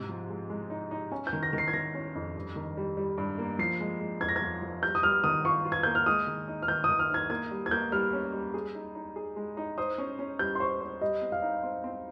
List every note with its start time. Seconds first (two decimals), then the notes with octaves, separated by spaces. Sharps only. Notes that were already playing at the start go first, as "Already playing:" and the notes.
Already playing: G#2 C3
0.09 F3
0.30 G#3
0.50 G#3
0.70 D#4
0.91 D#4
1.11 C#4 G#5
1.27 G6
1.33 D#3
1.43 A#6
1.53 D#3
1.58 C7
1.68 G#6
1.73 D#3 A#6
1.94 C#4
2.15 F2
2.35 G2
2.56 D#3
2.77 G3
2.97 G3
3.18 G2
3.38 A#3
3.59 F3 C7
3.80 G#3
4.00 G#3
4.21 F2 G#6
4.29 A#6
4.36 G#6
4.42 F3
4.62 F3
4.83 G3 G6
4.95 D#6
5.03 G3 F6
5.24 D#3 D#6
5.45 F4 C#6
5.65 F4
5.72 G#6
5.83 A#3 G6
5.95 F6
6.06 G#3 D#6
6.27 D#3
6.48 D#4
6.62 F6
6.68 D#3 G6
6.84 D#3 D#6
6.99 F6
7.10 D#4 G#6
7.30 A#3 G#6
7.51 G3
7.66 G#6
7.71 A#3 G6
7.92 G3 F6
8.13 C#4
8.33 G3
8.54 G#4
8.75 D#4
8.95 D#4
9.16 G#4
9.36 G#3
9.57 D#4
9.78 C5 D#6
9.98 C#4
10.19 C#4
10.39 G3 G6
10.55 C6
10.60 C5 C#6
10.81 C5
11.01 G3 D#5
11.22 C4
11.32 F5
11.42 D#4
11.63 C4
11.84 C4